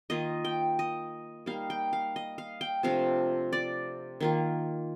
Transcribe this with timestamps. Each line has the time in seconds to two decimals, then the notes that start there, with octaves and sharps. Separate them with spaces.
0.10 D#3 A#3 F4 D#5
0.45 G5
0.79 D#5
1.46 G3 A#3 D#4 F5
1.70 G5
1.93 F5
2.16 D#5
2.38 F5
2.61 G5
2.83 C3 F3 A3 D4 F5
3.53 D5
4.20 D#3 A#3 F4